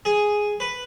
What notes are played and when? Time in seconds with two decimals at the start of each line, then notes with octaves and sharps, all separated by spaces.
0.05 G#4
0.60 B4